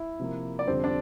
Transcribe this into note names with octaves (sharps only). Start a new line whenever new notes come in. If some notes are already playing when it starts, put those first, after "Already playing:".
Already playing: E4 E5
C3 F3 A#3
D5
F2 D3 G3 C4 C5
D4 D5